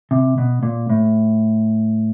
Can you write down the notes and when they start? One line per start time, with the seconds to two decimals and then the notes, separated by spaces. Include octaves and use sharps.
0.11 C3
0.38 B2
0.63 A#2
0.90 A2